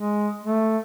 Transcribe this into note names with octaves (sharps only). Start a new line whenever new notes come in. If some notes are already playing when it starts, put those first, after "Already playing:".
Already playing: G#3
A3